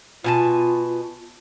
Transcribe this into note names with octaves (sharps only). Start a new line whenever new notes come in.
B2 F4 G#5 A5